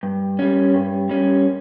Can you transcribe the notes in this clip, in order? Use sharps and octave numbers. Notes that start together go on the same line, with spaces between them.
G2
G3 C#4
G2
G3 C#4